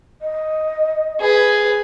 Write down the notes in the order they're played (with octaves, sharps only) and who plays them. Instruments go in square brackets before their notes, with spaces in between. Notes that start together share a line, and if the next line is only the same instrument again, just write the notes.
[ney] D#5
[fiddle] G#4 B4